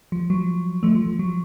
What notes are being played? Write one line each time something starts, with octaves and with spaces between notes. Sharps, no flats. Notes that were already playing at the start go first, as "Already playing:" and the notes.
F3
F#3
F3 A3
F3
F3
F#3